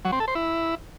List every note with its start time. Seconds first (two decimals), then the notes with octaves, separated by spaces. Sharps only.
0.05 F#3
0.12 C4
0.20 A4
0.28 C5
0.35 E4